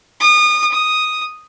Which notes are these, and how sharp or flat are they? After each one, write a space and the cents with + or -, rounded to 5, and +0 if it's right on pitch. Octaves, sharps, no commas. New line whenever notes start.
D#6 -30
D#6 +0